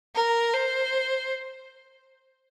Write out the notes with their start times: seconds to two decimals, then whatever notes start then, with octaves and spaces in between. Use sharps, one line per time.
0.15 A#4
0.53 C5